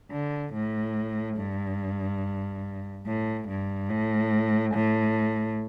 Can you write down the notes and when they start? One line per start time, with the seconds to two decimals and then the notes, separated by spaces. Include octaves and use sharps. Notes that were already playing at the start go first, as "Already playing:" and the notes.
0.11 D3
0.53 A2
1.37 G2
3.06 A2
3.48 G2
3.90 A2
4.74 A2